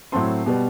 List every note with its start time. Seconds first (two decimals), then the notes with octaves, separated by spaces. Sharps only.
0.12 A2 F#3 C4 A5 C6
0.46 B2 G3 B3